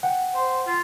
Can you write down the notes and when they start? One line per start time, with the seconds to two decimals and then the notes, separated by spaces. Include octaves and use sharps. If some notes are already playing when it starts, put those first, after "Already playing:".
0.03 F#5 G5
0.35 C5
0.67 F4